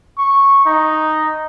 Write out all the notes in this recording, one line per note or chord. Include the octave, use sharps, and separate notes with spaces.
C#6
D#4